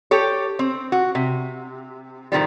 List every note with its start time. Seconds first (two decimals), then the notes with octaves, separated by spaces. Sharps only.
0.11 G4 A4 C#5
0.59 C4
0.92 F#4
1.15 C3
2.32 A2 D#3 F3 G3